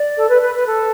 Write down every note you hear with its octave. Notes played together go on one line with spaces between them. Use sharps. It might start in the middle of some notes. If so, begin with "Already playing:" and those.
Already playing: D5
A4
B4
B4
B4
A4